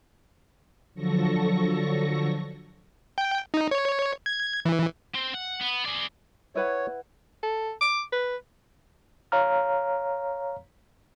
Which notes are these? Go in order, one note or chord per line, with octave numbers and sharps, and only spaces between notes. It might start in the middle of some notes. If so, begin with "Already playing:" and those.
D3 F3 F#3 A4 C#6 A#6
G5
D#4
C#5
G#6
E3
C4
F#5
B3
G#4 D5
E4 B4 C#5 F#5
A4
D6
B4
C#5 F5 A#5 F6